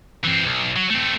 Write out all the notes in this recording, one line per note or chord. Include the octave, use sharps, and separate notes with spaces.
E3 C4
B1
F#3
A3 C4